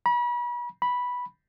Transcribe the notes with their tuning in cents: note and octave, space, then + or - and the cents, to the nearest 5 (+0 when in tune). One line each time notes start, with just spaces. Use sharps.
B5 -35
B5 -5